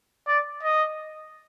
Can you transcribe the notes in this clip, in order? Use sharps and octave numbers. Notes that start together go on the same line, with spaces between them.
D5
D#5